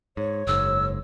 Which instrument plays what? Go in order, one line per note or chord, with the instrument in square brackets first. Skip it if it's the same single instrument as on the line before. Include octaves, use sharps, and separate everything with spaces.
[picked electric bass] G#2 [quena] C#5
[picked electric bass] F#1 G#2 [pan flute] E6